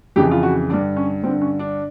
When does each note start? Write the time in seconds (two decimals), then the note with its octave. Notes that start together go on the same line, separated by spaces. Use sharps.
0.16 F2 C#3 E3 G4
0.31 F4
0.43 F#4
0.69 D3 D4
0.73 G2
0.96 C#4
1.23 G2 C4
1.27 D3
1.41 C#4
1.59 D4